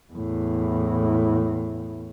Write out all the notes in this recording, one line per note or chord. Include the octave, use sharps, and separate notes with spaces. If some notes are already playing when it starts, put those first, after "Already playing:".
E2 A2